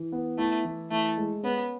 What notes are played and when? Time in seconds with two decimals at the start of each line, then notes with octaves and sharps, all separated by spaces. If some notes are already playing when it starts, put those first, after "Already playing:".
Already playing: E3
0.12 B3
0.38 A3 E4
0.65 E3
0.91 E3 A3
1.17 G#3
1.43 B3 C#4